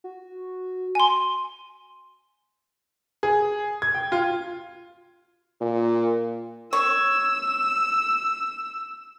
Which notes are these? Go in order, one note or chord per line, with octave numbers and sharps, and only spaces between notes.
F#4
G#5 C6
G#4
G#6
G5
F4
A#2
C#5 E6